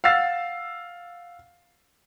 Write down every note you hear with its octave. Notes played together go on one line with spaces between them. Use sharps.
F5 F#5 E6 A6 C7